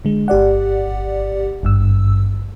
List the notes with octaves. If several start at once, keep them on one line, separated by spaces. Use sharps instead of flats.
D3 G#3
G1 G4 D5 F#5
G#1 G2 E6